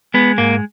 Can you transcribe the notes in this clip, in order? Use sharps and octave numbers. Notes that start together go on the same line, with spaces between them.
G#3 B3
G#2 A#3